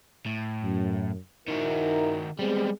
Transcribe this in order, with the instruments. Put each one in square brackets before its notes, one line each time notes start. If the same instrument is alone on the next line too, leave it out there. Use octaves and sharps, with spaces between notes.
[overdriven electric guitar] A2
[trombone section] F#2
[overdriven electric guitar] D#3 F#4 [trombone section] D#4 E4 A#4
[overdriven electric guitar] G3 G#3 [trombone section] B3 C4 G#4